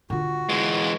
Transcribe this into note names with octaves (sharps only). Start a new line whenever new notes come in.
D3 F4 F#4
E3 G#3